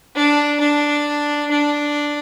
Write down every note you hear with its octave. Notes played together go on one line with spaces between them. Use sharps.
D4
D4
D4